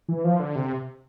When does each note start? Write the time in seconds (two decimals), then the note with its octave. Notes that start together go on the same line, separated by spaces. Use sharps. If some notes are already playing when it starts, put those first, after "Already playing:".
0.09 E3
0.25 F3
0.40 D3
0.56 C3